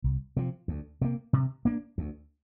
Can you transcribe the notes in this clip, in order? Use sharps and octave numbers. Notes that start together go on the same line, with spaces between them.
C2
C3 F3
D2
C3 A#3
C3
A#3 D4
D2